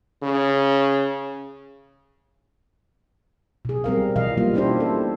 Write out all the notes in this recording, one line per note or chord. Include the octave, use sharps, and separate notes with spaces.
C#3
B2 G#4
G3 C4 A#4 F5
B2 E3 D#5 F5
G3 A#3 F4
C#4 D4 E4 G4 C5
A4